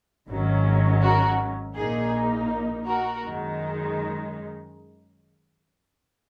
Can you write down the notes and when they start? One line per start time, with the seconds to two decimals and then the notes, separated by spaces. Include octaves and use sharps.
0.28 G#1 G#2 D#3 F#3 C#4
1.02 F#4 A#4
1.75 A#1 A#2 A#3 D#4 G#4
2.86 F#4 A#4
3.24 F#2 D#3 G#3 D#4